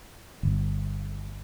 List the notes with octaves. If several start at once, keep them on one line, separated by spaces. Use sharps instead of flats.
G1